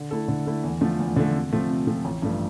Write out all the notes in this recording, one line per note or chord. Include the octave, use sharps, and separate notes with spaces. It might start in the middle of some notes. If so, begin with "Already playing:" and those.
Already playing: D3
A3 E4 A4
D3
A3 E4 A4
E2
D3 F3 A3
E2
D3 F3 A3
C3
F3 A3 C4
C3
F3 A3 C4
A1
G2 F3 A3